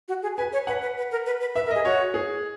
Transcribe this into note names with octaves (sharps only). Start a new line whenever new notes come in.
F#4
G#4
B4 G#5
C#5
B4 F#5
B4
B4
A#4
B4
B4
B4 E5
A#4
G#4 D#5
F#4 C#5
G#4